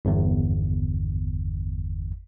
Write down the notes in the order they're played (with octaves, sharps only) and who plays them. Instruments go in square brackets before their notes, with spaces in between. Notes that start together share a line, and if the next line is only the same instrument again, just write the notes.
[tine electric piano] G1 E2